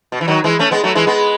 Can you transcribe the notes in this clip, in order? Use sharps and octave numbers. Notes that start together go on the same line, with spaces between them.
B2
E3
D#3 F#3
E3 G#3
A3 C#4
G#3 B3
F#3 A3
E3 G#3
G#3 B3